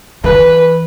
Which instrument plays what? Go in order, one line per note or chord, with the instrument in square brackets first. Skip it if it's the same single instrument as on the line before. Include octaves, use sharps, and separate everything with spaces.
[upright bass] E3 [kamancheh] B4